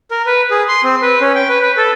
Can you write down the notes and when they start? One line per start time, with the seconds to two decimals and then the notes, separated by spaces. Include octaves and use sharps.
0.11 A#4
0.26 B4
0.51 G#4
0.68 C6
0.84 C4
1.02 B4
1.21 C#4
1.35 G5
1.49 B4
1.62 B4
1.77 A4